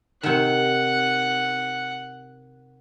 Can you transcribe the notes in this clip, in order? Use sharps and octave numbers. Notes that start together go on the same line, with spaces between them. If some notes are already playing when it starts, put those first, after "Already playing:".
C3 D#3 F#5